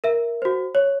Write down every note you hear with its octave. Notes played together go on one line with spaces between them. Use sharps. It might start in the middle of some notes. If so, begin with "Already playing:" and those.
A#4 E5
F#4 C5
C#5